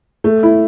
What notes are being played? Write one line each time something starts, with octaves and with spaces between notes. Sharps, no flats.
A3
E4